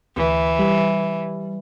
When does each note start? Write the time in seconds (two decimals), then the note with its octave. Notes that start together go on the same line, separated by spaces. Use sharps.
0.17 D2 E3
0.59 G3